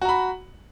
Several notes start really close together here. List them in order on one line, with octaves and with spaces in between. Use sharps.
F#4 A#5 B5